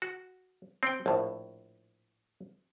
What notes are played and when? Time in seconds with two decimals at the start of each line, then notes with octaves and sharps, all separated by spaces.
0.02 F#4
0.83 C4 G5
1.06 A#1 A2